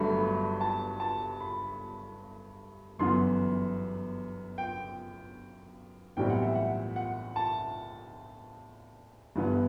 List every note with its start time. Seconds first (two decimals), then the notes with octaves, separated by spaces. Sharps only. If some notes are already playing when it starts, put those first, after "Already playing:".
Already playing: G1 G2 F#3 A3 B5
0.20 B5
0.61 A5
1.00 A5
1.40 B5
2.99 G1 F#2 E3 B3 C6
4.58 G5
6.17 B1 A2 E3 G3 C4 G5
6.30 F#5
6.43 E5
6.55 F#5
6.96 F#5
7.36 A5
9.35 G1 G2 E3 B3